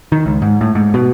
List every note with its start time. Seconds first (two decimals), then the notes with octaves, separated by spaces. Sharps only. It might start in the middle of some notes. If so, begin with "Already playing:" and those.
0.12 D#3
0.26 C#2
0.42 G#2
0.61 A2
0.75 G#2
0.94 B2